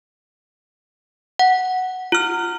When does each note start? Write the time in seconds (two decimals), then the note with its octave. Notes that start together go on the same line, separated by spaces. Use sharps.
1.39 F#5
2.12 F4 F6